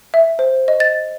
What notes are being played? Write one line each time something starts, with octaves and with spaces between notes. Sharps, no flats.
E5
C5
D#5
A6